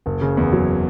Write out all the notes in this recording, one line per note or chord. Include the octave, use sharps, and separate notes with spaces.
F#1
C#3
E2
F#3